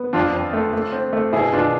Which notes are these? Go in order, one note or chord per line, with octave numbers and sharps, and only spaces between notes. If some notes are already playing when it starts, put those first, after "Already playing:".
Already playing: B3
F2 D4 F4
F2
A3
A3
C4
A3
B2 E4 G#4
B2 D4 F4